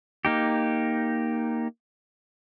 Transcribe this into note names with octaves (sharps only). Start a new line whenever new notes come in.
A#3 D#4 G4